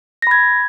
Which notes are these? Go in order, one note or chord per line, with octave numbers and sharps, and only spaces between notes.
B5 G#6 A#6